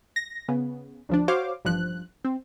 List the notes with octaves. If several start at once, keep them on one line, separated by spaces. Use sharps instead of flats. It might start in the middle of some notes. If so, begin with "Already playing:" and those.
A#6
C#3 B3
D2 F3 D4
F#4 C5 C#5 F5 D6
A1 G2 F3 F#6
C4